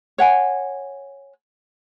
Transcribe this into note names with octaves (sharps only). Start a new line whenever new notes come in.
C#5 F#5 G#5